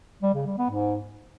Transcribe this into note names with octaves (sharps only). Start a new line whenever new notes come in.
G3
C#3
G3
B3
G#2